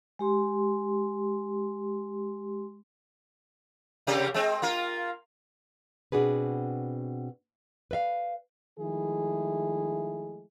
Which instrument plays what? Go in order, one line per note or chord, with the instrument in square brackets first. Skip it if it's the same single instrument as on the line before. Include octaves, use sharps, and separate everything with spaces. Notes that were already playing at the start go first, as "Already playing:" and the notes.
[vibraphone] G#3 G4 C6
[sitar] C3 A#3 G4
G#3 C4
A#3 F4 A#4
[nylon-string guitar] B2 C4 D4 F#4 G#4 B4
B4 D5 E5 F5
[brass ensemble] D#3 F3 G#3 A3 E4 G#4